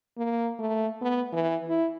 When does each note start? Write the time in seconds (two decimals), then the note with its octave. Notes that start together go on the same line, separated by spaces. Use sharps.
0.17 A#3
0.59 A3
1.02 B3
1.33 E3
1.68 E4